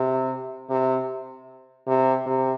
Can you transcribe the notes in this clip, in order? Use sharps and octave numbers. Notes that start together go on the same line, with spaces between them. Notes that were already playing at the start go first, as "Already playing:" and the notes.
Already playing: C3
C3
C3
C3